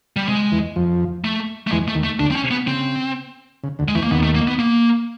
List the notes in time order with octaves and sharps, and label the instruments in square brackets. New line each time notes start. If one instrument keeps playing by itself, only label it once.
[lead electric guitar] G3
[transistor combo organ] C3 [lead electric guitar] G#3
[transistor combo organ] E2 E3
F2 F3
[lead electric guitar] A3
A3
[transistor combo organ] E2 E3 [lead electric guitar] G#3
[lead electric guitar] A3
[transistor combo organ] D#2 D#3
[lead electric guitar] A3
[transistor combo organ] D2 D3 [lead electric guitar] D4
[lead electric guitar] C4
C#4
[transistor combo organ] C3
[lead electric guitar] B3
[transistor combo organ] C#3 [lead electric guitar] C4
[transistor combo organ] C#3
D2 D3
[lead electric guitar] G#3
[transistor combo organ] E2 E3 [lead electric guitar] A3
[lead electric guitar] A#3
[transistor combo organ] D#2 D#3 [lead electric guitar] B3
[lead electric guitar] A3
A#3
B3
A#3